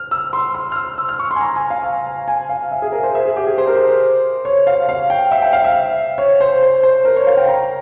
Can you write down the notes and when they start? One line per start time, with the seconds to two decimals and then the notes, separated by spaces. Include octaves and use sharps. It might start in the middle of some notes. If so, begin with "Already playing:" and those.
Already playing: F6
0.11 E6
0.33 C6
0.55 C6
0.72 F6
0.76 E6
0.98 E6
1.09 F6
1.19 C#6
1.31 C6
1.36 G#5
1.41 A#5
1.56 G#5
1.70 F5
1.84 G#5
2.06 G#5
2.28 G#5
2.49 F5
2.72 E5
2.82 G#4
2.92 A#4
3.03 C5
3.15 E5
3.25 G#4
3.36 G4
3.47 G#4
3.58 C5
3.67 A#4
3.76 C5
4.45 C#5
4.67 F5
4.89 F5
5.10 G5
5.31 E5
5.42 G5
5.53 F5
5.64 E5
6.18 C#5
6.40 C5
6.62 C5
6.83 C5
7.05 A#4
7.16 C#5
7.27 F5
7.37 G5
7.48 A#5